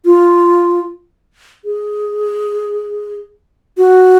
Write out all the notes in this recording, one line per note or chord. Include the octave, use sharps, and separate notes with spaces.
F4
G#4
F#4